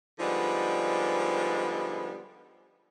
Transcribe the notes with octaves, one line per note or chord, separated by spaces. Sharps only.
D3 F3 G3 G#3 B3 D#4